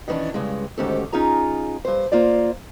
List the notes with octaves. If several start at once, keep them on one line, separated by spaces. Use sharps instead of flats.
D#3 E3 B3 C#4 D4
G2 C#3 G#3
D2 G#2 D#3 C#4 G4 A4
C#4 D#4 F4 G#4 A#5
G2 C5
A#3 F4 C5 D5